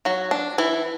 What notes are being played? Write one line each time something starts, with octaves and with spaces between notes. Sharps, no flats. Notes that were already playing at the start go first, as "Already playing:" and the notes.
F#3 F#4
D4
E3 E4